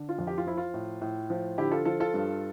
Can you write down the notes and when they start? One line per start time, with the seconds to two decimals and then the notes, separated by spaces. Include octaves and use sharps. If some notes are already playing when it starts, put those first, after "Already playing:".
Already playing: D3
0.09 F4
0.19 F2
0.27 G4
0.38 F4
0.47 F3 E4
0.57 F4
0.74 A2
1.01 A2
1.30 F3
1.58 D3 E4 G4
1.71 F4 A4
1.85 F3 F4 A4
2.00 F4 A4
2.14 G2